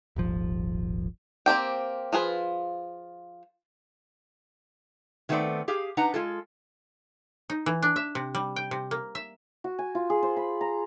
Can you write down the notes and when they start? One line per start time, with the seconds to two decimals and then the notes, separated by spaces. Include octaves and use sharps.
0.16 D#1 G#1 F3
1.46 A#3 C4 G4 G5
2.13 F3 F4 G#4 B4
5.29 D#3 A3 B3 C4 A4 D5
5.68 G4 G#4 F5
5.97 D4 D#4 B4 F#5 A#5
6.14 G#3 F4 A4
7.50 D#4
7.66 E3
7.82 D4
7.96 E5
8.15 C3
8.35 G3
8.56 G5
8.71 C3
8.91 A#3
9.15 E5
9.64 F#4
9.79 G#5
9.95 F4
10.10 G#4
10.23 C5
10.37 B5
10.61 A#5